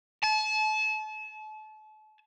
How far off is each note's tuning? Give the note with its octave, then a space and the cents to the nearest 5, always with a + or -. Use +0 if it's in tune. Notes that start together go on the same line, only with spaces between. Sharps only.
A5 -35